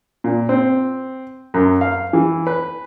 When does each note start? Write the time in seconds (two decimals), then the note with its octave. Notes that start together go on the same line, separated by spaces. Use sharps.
0.24 A#2
0.49 C4
1.54 F#2
1.81 F5
2.13 E3
2.47 B4